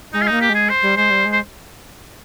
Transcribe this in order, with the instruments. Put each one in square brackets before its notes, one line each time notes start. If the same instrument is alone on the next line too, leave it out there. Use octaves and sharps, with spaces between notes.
[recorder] G#3 [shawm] D#4
[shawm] F4
[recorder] A#3 [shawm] D#4
[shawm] G4
[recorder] G#3 [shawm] G#4
[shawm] C5
[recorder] G3
[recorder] G#3 [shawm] C5
[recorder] G3
G#3
[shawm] C5